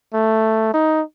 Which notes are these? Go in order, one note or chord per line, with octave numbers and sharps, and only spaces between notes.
A3
D#4